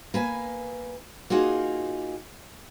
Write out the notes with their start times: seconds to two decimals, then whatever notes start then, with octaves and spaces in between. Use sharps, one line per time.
0.14 A#3 B4 G#5
1.30 A#3 D#4 F4 F#4 G#4